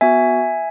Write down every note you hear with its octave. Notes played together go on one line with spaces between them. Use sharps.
B3 F#4 E5 G#5